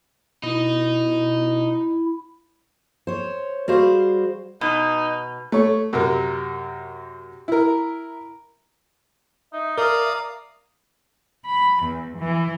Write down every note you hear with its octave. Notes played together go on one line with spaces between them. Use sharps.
B2 D#4 E4
C5 C#5
G3 F#4 G#4 C5 F5
B2 D#4
A3 C#5
F#2 C3 A#4
E4 A#4
D#4 E5
A#4 D5 F5 A#5 D#6
B5
E2
E3